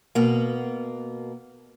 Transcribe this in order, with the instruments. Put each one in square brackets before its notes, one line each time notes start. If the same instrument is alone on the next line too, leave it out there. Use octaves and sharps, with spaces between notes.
[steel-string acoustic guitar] B2 A#3